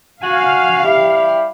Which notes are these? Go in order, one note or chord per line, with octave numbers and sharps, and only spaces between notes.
F#4 F5 G#5
G3 E4 G4